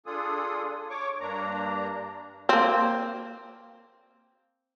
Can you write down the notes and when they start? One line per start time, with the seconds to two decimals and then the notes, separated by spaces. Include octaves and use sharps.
0.06 D4 F4 G#4 A4 D#6
0.90 C#5 C#6 D6
1.20 G2 A#3 D4 A#5
2.49 A#3 C4